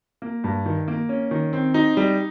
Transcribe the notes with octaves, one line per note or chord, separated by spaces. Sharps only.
A#3
G2
D#3
A#3
C#4
D#3
C4
D#4
G3